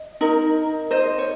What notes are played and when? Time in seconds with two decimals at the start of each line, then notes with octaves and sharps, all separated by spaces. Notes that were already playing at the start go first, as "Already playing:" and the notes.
Already playing: D#5
0.21 D#4 A#4
0.91 C5 D#5
1.19 C#5